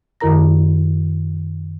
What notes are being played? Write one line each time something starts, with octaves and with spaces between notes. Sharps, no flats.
F#2 D#3 E4 A#4 A#5 A#6